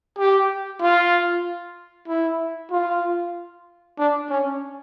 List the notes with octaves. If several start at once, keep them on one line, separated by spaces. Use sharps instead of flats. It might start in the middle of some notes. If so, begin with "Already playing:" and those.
G4
F4
E4
F4
D4
C#4